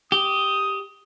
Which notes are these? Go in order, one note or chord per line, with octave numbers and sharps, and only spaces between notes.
G4 D#6